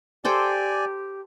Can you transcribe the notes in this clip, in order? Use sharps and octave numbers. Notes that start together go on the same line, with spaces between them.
G4 A4 C5 D5 G5 G#5